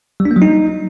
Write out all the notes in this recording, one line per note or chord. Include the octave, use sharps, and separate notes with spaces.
G3
D4
A#3
F#3
D#4